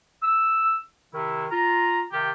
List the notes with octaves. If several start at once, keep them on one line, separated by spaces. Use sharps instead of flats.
E6
C3 D#3 E4
F4 A#5
C3 D#3 F4 G4